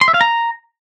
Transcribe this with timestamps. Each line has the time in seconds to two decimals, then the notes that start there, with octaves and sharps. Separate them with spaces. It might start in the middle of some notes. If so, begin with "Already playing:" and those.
0.01 C6
0.08 E5
0.14 F5
0.21 A#5